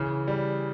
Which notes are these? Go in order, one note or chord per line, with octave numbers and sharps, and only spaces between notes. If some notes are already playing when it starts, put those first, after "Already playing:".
Already playing: C#3 E3
G3